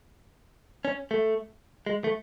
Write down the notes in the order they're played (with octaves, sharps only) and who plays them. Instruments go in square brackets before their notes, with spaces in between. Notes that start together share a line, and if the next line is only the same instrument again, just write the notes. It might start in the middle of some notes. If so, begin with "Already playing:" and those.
[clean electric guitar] C#4
A3
G#3
A3